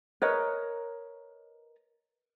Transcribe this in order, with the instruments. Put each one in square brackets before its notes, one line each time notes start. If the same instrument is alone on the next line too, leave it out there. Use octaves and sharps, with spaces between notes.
[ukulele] A#4 B4 C#5 D#5